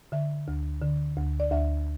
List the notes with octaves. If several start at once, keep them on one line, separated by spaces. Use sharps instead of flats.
D3 E5
D2
D3
D2
D5
D2 E5